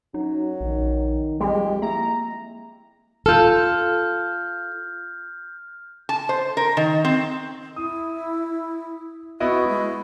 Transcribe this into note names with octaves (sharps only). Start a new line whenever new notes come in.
F#2 F#3 D#4
A#1 D#3
F2 G3 G#3 G4
A#3 E4 A#5
F4 A4 F6 G6
A5
C5
A#4
D#3
C4
E4 D#6
B3 E4 F#4 D#5
G#3